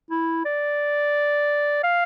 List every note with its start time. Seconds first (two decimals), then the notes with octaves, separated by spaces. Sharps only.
0.11 E4
0.45 D5
1.84 F5